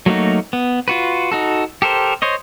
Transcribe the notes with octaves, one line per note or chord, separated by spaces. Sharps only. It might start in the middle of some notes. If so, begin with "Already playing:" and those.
F#3 A3 A#3 D#4 F#4
B3
F4 F#4 B4
D#4 F#4 A4
G4 A4 A#4 C5
C5 C#5 D#5